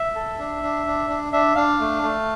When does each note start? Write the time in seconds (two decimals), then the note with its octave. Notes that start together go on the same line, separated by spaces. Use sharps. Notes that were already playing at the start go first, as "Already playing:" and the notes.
Already playing: E5
0.15 A4
0.39 D4
0.63 D4
0.86 D4
1.09 D4
1.32 D4 E5
1.55 D4 F5
1.80 A3
2.02 A3